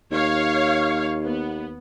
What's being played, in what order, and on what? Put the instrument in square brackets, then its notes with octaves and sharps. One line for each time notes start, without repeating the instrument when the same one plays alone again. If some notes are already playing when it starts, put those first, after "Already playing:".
[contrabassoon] D#2 [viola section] C#5 F5
[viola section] B3